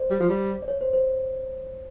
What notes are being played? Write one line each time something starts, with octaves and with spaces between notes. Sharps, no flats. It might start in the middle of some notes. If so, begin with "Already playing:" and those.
Already playing: C5 D5
G3
F3
G3
D5
C#5
C5
C5